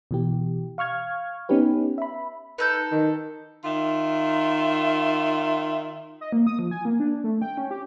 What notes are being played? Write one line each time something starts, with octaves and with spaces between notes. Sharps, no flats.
B2 E3 G4
F5 C#6 F6 G#6
B3 C#4 D#4 G4 B4
E5 B5
D#4 A4 B4 G6
D#3
D#3 F4 E5
D#5
A#3
D#6
F3
G#5
A#3
D4
A3
G5
C#4
G4